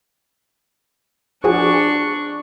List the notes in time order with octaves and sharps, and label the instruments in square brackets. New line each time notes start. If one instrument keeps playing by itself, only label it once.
[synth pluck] F3 F#4 G#4 [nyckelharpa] D4 C#6